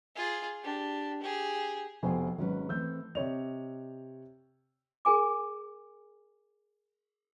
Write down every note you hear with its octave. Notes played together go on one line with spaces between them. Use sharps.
F4 G#4
D4 G4
G4 G#4
F1 B2 F3 C5 G5 G#5
G#1 F#3 C#4 B4
E3 A3 C4 E6 G6
C3 C#5 D#5 F7
G#4 A#4 G#5 D6